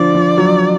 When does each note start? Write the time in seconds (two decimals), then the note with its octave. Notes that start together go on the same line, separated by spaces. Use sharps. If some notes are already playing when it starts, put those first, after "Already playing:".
Already playing: D3 F3 D5
0.14 F3
0.38 F#3